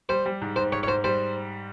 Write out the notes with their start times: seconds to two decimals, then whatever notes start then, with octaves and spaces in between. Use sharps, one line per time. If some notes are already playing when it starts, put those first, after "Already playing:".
0.09 G3 C5
0.26 G3
0.42 G#2
0.56 G#2 C5
0.72 G#2 C#5
0.83 C#5
0.87 G#2 C5
1.04 G3 C5